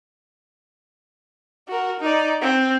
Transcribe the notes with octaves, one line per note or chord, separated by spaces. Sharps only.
F#4 A#4
D#4 D5
C4